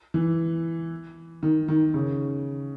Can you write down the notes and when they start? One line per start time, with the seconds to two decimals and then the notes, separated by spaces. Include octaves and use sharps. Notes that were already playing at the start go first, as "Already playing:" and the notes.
0.14 E3
1.43 D#3
1.68 D#3
1.94 C#3